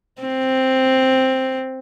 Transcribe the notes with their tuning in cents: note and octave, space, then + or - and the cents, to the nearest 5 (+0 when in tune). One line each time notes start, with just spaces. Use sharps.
C4 +5